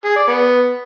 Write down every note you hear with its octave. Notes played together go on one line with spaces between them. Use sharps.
G#4
D5
B3